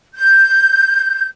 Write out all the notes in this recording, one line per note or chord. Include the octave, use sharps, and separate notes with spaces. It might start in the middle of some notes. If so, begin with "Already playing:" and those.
G6